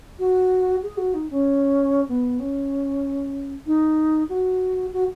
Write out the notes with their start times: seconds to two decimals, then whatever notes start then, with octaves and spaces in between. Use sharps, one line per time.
0.19 F#4
0.83 G#4
0.97 F#4
1.14 D#4
1.30 C#4
2.09 B3
2.40 C#4
3.66 D#4
4.29 F#4
4.93 F#4